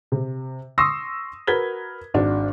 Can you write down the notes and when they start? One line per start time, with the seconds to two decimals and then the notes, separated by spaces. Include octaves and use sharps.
0.12 C3
0.78 C6 C#6 D#6 E6 A#6 C7
1.47 F#4 A#4 B4 G#6 B6 G7
2.14 G#1 D4 F#4